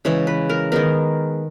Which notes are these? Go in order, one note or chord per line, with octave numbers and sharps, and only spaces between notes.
C#3 E3 G#3 C#5
B4
A#4
D#3 G#3 B3 A#4